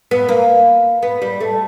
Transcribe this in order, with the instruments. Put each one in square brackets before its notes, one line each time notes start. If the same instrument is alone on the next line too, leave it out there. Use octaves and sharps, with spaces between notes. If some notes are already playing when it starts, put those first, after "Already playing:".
[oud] B3
A#3
B3
G3
A3